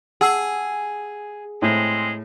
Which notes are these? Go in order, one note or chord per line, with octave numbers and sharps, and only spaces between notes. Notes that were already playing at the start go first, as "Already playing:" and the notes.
G#4 F#5 A5 E6
A2 G#3 C4